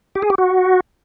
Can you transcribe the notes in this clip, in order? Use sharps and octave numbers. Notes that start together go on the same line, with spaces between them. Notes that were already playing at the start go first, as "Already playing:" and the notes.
G4
G#4
G4
F#4